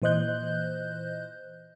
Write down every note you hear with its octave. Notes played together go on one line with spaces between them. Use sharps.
A#2 E3 C5 D#5 F#6 G6